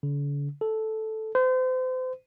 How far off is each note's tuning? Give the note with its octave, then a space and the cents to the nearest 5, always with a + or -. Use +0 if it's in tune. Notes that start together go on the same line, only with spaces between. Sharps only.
D3 -45
A4 -5
C5 -35